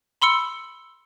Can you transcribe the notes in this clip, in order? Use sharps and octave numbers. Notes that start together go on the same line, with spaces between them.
B5 C6 E6 C#7